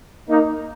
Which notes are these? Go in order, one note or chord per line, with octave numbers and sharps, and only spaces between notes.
A#3 D#4